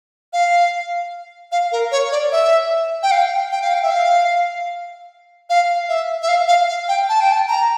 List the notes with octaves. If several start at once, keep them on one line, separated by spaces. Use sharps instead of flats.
F5
F5
A#4
C#5
D5
E5
G5
F5
G5
F5
G5
E5
F5
F5
E5
E5
F5
F5
F5
G5
A5
G5
A5
A#5